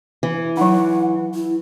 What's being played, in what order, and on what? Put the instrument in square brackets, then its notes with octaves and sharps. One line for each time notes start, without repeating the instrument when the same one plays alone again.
[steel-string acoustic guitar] E3
[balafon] F#3 D#4 [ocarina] F#5
[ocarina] E4